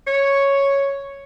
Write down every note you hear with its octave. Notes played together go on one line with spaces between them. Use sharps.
C#5